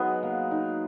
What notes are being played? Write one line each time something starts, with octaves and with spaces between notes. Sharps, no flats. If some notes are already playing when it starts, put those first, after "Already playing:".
Already playing: F#3 G#3 B3 D#4
A#3
D#4